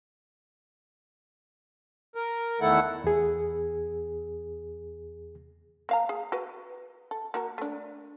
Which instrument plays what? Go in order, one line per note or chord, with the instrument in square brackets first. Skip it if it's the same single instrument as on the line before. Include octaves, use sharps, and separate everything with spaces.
[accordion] A#4
E2 D#3 A3 E4 A4 F#5
[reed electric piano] E2 G#4
[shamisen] A#3 F5 A#5
G#4
F#4 B4
A4
A#3 F#4 A#4
A3 D4